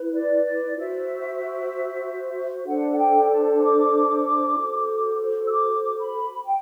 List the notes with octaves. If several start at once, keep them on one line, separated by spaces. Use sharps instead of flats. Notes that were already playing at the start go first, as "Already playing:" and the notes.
Already playing: E4 B4
D5
D5
F#4 C5 E5
D4 A4 C5 F#5
G5
G5
A5
D6
F#4 A4 C5
E6
D6
B5
G5